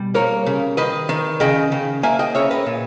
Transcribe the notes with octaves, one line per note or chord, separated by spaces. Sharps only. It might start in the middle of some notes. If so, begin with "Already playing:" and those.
Already playing: B2 G3
A#3 A#4 C#5
C#3
D#3 B4 D#5
D#3
C#3 D#5 G5
C#3
A#3 E5 G#5
D#5 G5
C#3 C#5 E5
B4 D#5
A#2